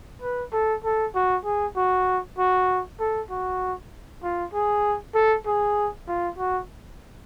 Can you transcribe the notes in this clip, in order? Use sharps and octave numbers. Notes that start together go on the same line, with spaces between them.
B4
A4
A4
F#4
G#4
F#4
F#4
A4
F#4
F4
G#4
A4
G#4
F4
F#4